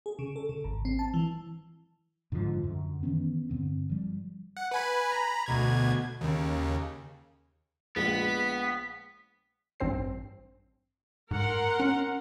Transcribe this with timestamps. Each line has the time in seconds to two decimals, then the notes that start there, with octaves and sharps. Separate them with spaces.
0.06 G#4
0.19 C#3
0.36 A4
0.49 C#3
0.64 G#1
0.85 C4
0.99 A5
1.14 E3
2.32 G#2 D3 E3 F3
2.63 F#2 D3
3.03 D#3 E3 B3 C#4
3.49 G2 D3 C4
3.90 F3 G3
4.57 F#5
4.71 B4 G#5 B5
5.12 A#5 B5
5.46 D2 B2 G#6
6.21 D#2 C#3
7.96 A#1 G#3 B3 B6
9.80 A1 G2 C4 C5 C7
11.31 G#2 A#4 F#5 C6
11.80 C#4